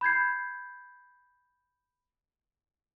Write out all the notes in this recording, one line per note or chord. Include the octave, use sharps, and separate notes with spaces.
B5 G6 G#6 C7